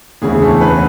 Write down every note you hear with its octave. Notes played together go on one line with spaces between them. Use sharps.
E1 D2 C#3 E3 G#4
A3 A4
B3 B4